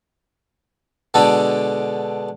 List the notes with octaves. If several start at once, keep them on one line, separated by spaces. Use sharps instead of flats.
B2 D3 G#3 D4 A4